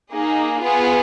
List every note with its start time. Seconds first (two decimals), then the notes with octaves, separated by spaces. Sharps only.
0.13 A#3 D#4 G#4
0.62 B3 F4 G#4